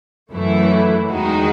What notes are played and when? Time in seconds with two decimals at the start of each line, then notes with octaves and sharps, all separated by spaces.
0.32 F#2 E3 A3 E4
1.08 E2 D#3 G#3 D#4 F#4